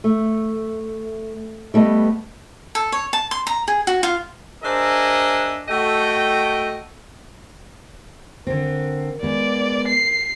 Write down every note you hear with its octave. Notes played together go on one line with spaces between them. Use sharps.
A3
G3 A3 B3 D#5
A4
C#5
A5
C6
A#5
G#4
F#4
F4
D4 G#4 A#4 C5 D#5 E5
A3 F#4 A4 D#5 G5
D3 C4 A#4
G#3 B3 D5
C7